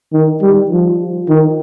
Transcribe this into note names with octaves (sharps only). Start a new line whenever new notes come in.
D#3
G3
F3
D#3